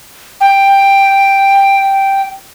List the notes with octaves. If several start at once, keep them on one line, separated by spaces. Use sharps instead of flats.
G5